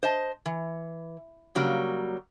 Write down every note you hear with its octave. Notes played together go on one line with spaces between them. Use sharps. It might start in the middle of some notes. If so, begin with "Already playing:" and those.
C5 D#5 A5
E3
C#3 F#3 G3 A#3